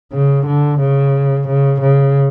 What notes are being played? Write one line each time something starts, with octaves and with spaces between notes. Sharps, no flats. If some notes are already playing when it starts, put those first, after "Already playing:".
C#3
D3
C#3
C#3
C#3